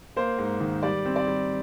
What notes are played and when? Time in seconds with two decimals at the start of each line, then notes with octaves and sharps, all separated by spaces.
0.16 A#3 C5
0.38 G#2
0.60 D#3
0.83 G3 D5
1.05 C4
1.16 D5
1.27 G3